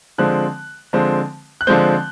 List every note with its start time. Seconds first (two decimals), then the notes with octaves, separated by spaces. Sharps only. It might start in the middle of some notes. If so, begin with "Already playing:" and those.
0.18 D3 F3 G#3 C4 F#6
0.93 D3 F3 G#3 C4
1.61 F#6
1.67 D3 F3 G#3 C4 G6